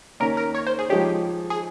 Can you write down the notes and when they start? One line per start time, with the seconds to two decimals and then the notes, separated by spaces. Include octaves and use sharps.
0.20 D#2 D#3 A#3 C#4 A#4
0.37 A#4
0.55 C#5
0.67 C5
0.79 G#4
0.90 F3 G#3 D#4 G4 G#4 C#5
1.50 G#4